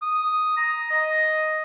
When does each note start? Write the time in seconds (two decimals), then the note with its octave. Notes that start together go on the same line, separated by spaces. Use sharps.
0.02 D#6
0.57 A#5
0.91 D#5